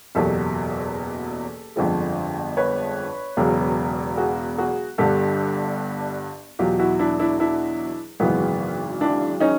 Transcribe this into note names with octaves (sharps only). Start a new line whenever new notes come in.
F#1 E2 B2 F#3 G4 A4
G1 F2 D3 F3 G#3
B4 C#5
E1 E2 C#3 F#3
F#4 G#4
F#4 G#4
G1 G2 D3 G4 A4
E2 B2 F#3 F4 G4
E4 F#4
D4 E4
D4 E4
D4 E4
G#1 F#2 C#3 E3 G#3 B3
D4 E4
C#4 D#4